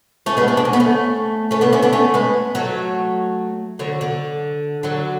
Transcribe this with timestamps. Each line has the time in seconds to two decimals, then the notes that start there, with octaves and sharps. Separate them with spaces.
0.26 A3 C#4
0.37 G#3 B3
0.48 G#3 B3
0.57 D4
0.65 C#4
0.73 B3
0.80 A3 C#4
1.51 A3 C#4
1.61 B3 D4
1.73 C#4 E4
1.82 B3 D4
1.93 A3 C#4
2.14 G#3 B3
2.55 F#3 A3
3.79 D3 F#3
4.01 D3
4.83 D3 F#3